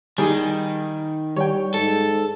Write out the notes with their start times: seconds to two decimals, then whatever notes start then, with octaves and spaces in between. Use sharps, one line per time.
0.18 D#3 G3 G#4
1.36 G3 C#5 G5
1.74 G#2 A4